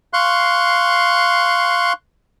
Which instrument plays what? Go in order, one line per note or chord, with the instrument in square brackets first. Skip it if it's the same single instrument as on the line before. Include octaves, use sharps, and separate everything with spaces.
[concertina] F5 C6 C#6 F#6